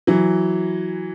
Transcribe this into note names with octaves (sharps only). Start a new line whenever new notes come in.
E3 F#3